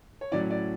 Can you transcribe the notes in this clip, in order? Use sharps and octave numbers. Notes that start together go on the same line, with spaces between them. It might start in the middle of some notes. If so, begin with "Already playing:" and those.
C#5
A2 F#3 C#4 E4 D5
D5